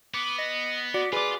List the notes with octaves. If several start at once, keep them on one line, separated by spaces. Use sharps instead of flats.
B3 D6
D#5
F#4 D5
F4 G#4 B4 D5